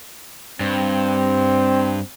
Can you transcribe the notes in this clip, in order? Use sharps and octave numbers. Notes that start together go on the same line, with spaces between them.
G2 C4